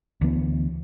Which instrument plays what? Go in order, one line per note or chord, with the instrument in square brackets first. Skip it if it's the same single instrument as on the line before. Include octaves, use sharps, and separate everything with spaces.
[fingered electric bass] D2 E3 B3